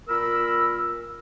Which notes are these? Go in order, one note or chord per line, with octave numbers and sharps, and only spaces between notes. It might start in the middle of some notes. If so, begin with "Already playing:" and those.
A#2 A#4 B5 E6